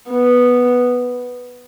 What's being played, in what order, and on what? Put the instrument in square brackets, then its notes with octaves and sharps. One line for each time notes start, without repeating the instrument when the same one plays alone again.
[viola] B3